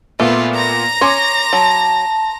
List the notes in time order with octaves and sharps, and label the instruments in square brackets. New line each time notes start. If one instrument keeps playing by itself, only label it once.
[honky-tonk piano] A#2 B3 [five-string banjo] A3 [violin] F4 B4
[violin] A#5 A#6
[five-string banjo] C#4 C#5 [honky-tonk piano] C6 D6
[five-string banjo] F#3 [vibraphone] A5